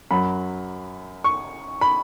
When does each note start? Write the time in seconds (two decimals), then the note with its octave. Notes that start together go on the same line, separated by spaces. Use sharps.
0.11 F#2 F#3 B5
1.24 C#6
1.81 B5